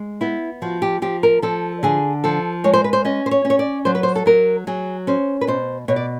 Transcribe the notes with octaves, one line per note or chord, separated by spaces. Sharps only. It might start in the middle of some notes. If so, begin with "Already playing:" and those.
Already playing: G#3
B3 E4
F3 F#4
G4
F3 G4
A#4
F3 A4
D3 G#4
F3 A4
G#3 C#5
C5
B4
C5
C#4 D#5
C5
C#5
C#4
C#5
D5
F#3 C5
B4
C5
A4
F#3 A#4
F#3 G#4
C#4 C5
B4
B2 C5
B2 C#5
D5